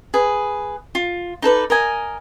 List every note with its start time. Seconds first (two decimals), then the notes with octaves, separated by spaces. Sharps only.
0.14 G#4 B4
0.95 F4
1.42 D#4 A4 B4 D5
1.70 A#4 D#5 G#5